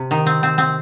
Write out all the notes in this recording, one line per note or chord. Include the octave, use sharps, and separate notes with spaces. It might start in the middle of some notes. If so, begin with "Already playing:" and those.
Already playing: C3
D#3
C4
C4
C4